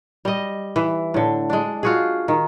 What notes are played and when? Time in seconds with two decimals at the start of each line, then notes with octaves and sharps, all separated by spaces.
0.25 G3 D#5
0.76 E3
1.14 A2 D3
1.50 G#3 D4
1.83 F4 F#4 G#4
2.28 D#3